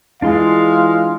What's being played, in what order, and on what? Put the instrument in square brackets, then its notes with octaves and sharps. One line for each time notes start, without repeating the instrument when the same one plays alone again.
[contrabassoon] E3 [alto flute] G#3 [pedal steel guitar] D4 F4 C6 [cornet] F5